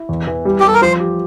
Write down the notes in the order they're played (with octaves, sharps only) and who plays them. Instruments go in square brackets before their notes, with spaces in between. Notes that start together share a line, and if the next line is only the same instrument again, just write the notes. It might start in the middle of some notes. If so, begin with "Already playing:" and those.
Already playing: [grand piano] E4
E2
E3
G3
[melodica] G4
[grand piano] G3 [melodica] A4
[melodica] A#4
[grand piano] F3 [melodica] C5
[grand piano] G4